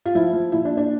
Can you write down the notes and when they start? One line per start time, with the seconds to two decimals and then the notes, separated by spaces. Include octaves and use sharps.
0.06 F4
0.15 F3 E4
0.33 F3
0.52 A#2 E4
0.65 D4
0.71 A#2
0.77 D4